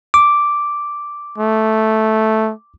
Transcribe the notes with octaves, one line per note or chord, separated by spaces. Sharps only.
D6
A3